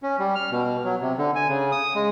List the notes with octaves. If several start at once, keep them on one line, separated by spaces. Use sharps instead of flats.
C#4
G3
F6
B2
F#3
C3
D3
G#5
C#3
D#6
G#3